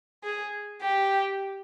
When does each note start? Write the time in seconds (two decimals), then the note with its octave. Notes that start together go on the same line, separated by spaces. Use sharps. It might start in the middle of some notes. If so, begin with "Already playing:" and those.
0.24 G#4
0.82 G4